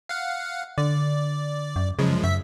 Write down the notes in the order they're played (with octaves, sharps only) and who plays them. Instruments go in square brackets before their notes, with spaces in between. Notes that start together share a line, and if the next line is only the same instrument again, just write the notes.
[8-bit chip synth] F5 F#5
[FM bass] D3 [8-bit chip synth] D5
[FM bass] F#2
[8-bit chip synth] F#2 F3 G#3 [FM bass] C#3
[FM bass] F#2 [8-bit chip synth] E5 B6